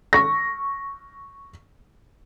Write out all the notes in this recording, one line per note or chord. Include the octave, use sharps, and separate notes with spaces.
C#6 A#6